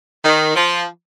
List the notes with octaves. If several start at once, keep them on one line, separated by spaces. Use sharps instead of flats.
D#3
F3